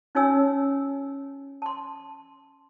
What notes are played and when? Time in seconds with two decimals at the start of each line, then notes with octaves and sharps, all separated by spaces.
0.15 C#4 D#4 F#4 C#5 G#5 E6
1.62 A5 C6